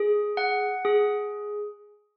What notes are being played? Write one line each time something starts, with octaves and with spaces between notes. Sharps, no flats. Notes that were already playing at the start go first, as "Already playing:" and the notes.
Already playing: G#4
F#5
G#4